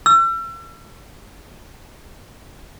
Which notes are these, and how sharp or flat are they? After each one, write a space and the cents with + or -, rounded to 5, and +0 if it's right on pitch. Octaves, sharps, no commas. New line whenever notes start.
E6 +40